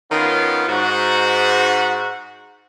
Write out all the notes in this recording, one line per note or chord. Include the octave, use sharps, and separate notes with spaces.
D#3 B3 C#4 F4
G#2 F#4